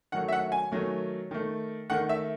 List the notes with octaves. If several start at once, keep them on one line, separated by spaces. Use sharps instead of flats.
D#3 F#3 A3 F#5
E5
F#5
G#5
D#3 F#3 A3
D#3 A3
D#3 A3 F#5
E5